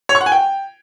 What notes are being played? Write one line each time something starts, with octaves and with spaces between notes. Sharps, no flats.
C#5
C#6
F#5
G#5
G5